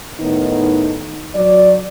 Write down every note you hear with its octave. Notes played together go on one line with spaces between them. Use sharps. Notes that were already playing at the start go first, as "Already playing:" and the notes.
A2 D#3 B3 D#4
F#3 D5